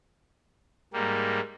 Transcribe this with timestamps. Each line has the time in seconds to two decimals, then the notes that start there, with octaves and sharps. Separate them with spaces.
0.93 G#2 G3 A#3